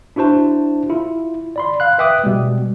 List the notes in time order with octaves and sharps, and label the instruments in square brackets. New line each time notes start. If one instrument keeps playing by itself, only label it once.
[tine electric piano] D4 E4 F#4 C5 A5
E4 F4
D5 B5 C6
F5 F#6
B4 E5 G5 D6 D#6 F#6
B2 G3 G#3